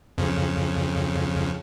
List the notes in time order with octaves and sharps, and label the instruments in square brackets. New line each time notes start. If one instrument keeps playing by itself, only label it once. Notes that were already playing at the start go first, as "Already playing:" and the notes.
[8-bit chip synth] F2 C#3